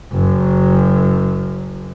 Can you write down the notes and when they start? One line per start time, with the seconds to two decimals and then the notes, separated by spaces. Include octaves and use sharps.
0.13 F#1 F#2